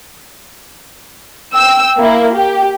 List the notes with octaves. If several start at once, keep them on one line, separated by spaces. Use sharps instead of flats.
G5 E6
A#3 E4
G4